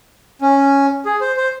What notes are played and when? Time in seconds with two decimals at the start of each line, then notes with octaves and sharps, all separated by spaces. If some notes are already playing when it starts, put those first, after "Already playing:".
0.41 C#4
1.05 G#4
1.21 C5
1.37 C5